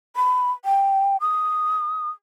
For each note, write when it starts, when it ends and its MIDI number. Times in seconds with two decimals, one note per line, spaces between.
0.16 0.52 83
0.65 1.17 79
1.21 2.10 87